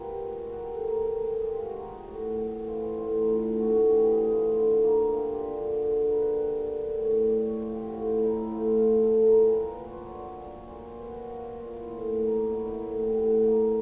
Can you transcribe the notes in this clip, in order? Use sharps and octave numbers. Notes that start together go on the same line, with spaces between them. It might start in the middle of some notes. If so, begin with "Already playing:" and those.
Already playing: D#3 B3 F4 G4
G#3
F#4
D#3 G4
A4
D#3 A#4
A4
B3
G#4
G#3 G4
F4
F#4
D#3
G4 G#4
A2 F#4
A3
E3 F4
A2 F4
D#4
A2 D4
A3 F#4
F#4
E3 G4
G#4
A2
F4
D3 E4
A#3
G3 F4
G4
D3
G#4
D3 G#4
A#3 B4
B4
G3
D3
A2 C#5
D5
A3 D5
C#5
F3 C5
G4
F#4
A2 F4
E4
A2 D#4
E4
A3 F4
F4
F3 A4
A4
A2
A#4
A#2 B4
A#4 B4
B3 B4
C#5
C5
D5
F#3 C#5
D5
A#2
C#5
A#2 C5
B3
F#4
F#3 F4
F#4
A#2 F4
E4
A2 E4
A#3
F#3 E4
D#4
E4
A2
G4
A2 F#4
A#3